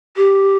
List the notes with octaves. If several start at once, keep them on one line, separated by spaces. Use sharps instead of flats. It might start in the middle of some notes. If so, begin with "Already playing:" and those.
G4